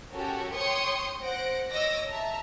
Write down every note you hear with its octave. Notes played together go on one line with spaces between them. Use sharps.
C#4 F#4 G4 A4 A#4
C#5 G5 C6 C#6 D#6 C#7
C5 F#5 A#6 D7
C#5 D#5 D6 E6 A#6
E5 A5 A#5